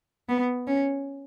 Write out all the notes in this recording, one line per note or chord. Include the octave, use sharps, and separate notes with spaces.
B3
C#4